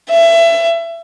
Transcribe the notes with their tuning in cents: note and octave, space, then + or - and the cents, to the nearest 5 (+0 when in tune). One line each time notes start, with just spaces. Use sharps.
E5 +25